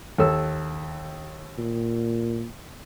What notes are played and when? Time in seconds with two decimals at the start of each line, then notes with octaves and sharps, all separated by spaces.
0.18 D#2 A4 E6
1.58 A#2